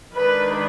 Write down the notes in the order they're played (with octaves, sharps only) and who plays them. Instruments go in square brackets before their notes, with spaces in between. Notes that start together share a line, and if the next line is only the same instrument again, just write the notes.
[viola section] D#3 G#3 D4 B4